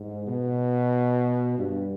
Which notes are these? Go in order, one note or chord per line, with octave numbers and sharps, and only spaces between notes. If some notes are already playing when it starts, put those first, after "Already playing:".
Already playing: G#2
B2
G2